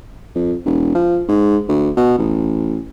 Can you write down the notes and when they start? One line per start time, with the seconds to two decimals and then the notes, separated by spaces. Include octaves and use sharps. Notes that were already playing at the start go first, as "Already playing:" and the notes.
0.36 F2
0.66 E1
0.95 F3
1.29 G#2
1.68 D2
1.97 B2
2.19 A1